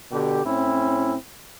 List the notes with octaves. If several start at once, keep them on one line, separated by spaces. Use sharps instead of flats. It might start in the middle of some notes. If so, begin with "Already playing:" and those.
B2 D3 G4
A2 C4 C#4 E4